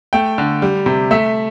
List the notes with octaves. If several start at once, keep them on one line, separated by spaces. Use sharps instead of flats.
A3 G5
D3
G3
C3
A3 E5